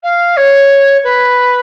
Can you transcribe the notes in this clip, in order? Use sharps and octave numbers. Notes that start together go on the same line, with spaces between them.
F5
C#5
B4